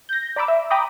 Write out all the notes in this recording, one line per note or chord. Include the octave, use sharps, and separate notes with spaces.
G6 A#6
D5 A#5 B5 D6 E6
E5
G5 A#5 B5 D6 D#6